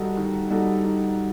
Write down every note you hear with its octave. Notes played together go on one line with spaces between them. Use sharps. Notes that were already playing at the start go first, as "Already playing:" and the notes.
Already playing: D#3 G3 D#4 F#4 A4
D#3
G3 D#4 F#4 A4
D#3